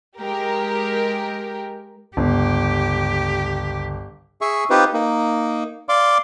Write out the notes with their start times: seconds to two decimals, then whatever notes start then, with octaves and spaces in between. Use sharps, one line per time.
0.21 G#3 G4 A#4
2.17 G1 C#2 G4
4.41 G#4 E5 C#6
4.70 C4 D#4 F4 G4 B4 C5
4.94 A#3 D#4
5.89 D5 F5 C6 D6